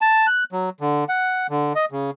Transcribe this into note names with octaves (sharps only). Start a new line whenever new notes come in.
A5
F#6
F#3
D3
F#5
D3
D#5
C#3